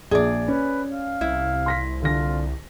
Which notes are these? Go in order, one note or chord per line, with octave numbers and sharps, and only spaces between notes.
A#1 G#4 D5 E5
C#4 B4
F5
C2 E4
C6 A#6 B6
D3 F4 A#6